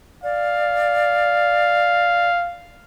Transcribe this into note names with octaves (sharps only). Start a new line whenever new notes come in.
D5 F5